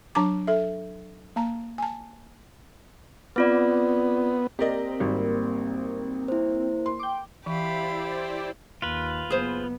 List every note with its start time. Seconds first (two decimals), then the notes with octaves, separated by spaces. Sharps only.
0.15 F#3 D4 A5 A#5 D6
0.47 A4 E5
1.36 A#3 A5 A#5
1.78 G#5 A5
3.36 B3 C4 F4 D5
4.59 A#3 C4 G4 A#4 D5 D#5
5.00 G#1 G3
6.28 E4 C5
6.86 C6
7.00 G5 D6
7.46 E3 E4 G4 C5 D5 E5 F5 B5
8.82 D#2 F4 B4
9.30 F#1 B3 G#4 C5